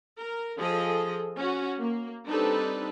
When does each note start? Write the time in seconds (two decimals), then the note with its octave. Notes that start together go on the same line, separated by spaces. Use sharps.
0.18 A#4
0.58 F3 G#4 A4 D#5
1.36 C#4 F#4
1.79 A#3
2.26 G3 C4 D4 D#4 A4 B4